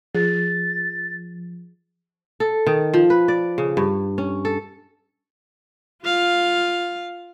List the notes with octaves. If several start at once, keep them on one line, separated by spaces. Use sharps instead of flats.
F3 G#4 A6
A4
D#3
F3
B4
D5
C#3
G2
C#4
A4
F4 F5